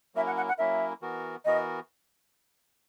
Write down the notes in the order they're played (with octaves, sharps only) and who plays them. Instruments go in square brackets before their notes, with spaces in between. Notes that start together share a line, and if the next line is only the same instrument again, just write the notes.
[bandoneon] F#3 A#3 C#4 E4 A#4 [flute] E5
[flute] F#5
F#5
F#5
[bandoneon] F#3 A#3 C#4 E4 A#4 [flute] E5
[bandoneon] E3 B3 F#4 A#4
[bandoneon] E3 B3 F#4 A#4 [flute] D#5